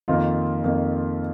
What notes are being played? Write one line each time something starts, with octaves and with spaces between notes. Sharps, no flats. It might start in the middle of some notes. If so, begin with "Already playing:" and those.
F2 D#3 A#3 F4
F2 D#3 A#3